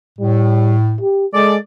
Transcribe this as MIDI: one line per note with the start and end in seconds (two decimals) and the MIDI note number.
0.19 0.98 45
0.19 0.77 55
1.01 1.26 67
1.34 1.57 56
1.34 1.56 68
1.34 1.56 69
1.34 1.56 74